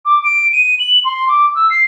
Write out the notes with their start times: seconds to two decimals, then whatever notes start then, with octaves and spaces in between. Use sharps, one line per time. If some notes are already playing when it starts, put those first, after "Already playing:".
0.05 D6
0.24 D7
0.52 D#7
0.79 F#7
1.04 C6
1.28 D6
1.55 E6
1.70 C7